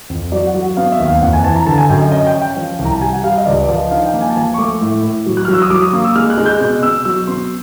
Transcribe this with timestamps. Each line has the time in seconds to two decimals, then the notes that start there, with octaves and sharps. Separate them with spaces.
0.10 F2
0.32 F#3 D5
0.47 F#5
0.54 F#3
0.62 F#5
0.77 B3 F5
0.92 E5
1.00 D#2
1.07 F5
1.22 F2 F#5
1.33 G#5
1.44 E3 A5
1.55 A#5
1.67 D3 A5
1.78 G#5
1.89 F#2 G5
2.00 D#5
2.12 C#4 D#5
2.27 G5
2.34 C#4
2.42 G5
2.57 F3
2.79 C2
2.85 A#5
2.93 A5
3.01 G3 G#5
3.13 F#5
3.24 G3 F5
3.38 D#5
3.46 C#2 D5
3.64 D5
3.69 F3 D#5
3.91 D#4 F5
4.06 G5
4.14 A#3
4.21 G#5
4.30 A5
4.36 F3 G#5
4.54 C#6
4.58 A3 D6
4.81 A2
5.03 A2
5.26 F#3
5.37 F#6
5.45 F#3 F6
5.54 E6
5.62 D#6
5.70 F#3 D6
5.82 D#6
5.93 A#3 D#6
6.04 E6
6.16 G#3 F6
6.30 F#6
6.38 G#3
6.46 G6
6.60 B2 F#6
6.83 B2 E6
7.05 F#3 E6
7.27 B3 C6